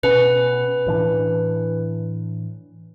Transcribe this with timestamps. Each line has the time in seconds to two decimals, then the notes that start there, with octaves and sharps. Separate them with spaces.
0.03 B2 C#4 B4
0.86 A2 E3 D4